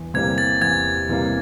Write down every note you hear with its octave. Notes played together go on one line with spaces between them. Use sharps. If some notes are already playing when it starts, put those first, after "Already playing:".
Already playing: E2
C3 E3 G3 A#3 G#6
A6
E2 G#6
C3 E3 G3 A#3